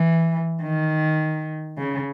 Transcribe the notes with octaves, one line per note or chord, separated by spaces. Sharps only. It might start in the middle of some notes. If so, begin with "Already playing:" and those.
Already playing: E3
D#3
C#3